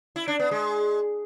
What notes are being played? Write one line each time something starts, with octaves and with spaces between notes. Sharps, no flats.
E4
D4
B3
G#3